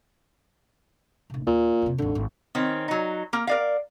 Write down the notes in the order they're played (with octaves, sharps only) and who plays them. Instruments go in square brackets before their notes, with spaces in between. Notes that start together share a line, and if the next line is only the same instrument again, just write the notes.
[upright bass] D1 C3
[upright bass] D#2 F4 [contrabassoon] A#2
[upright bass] F2 C3
[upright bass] G#1 D#2 [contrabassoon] D3
[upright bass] G#1
[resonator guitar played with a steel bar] D#3 C4 C#4
F#3 D#4
A#3 A#4
A#4 D5 F5